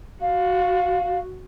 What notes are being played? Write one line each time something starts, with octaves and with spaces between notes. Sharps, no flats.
F#4 F5